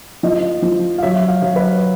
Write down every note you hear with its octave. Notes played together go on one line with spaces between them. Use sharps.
F3 D#5
F3
F5
F#3 E5
F5
F#3
B4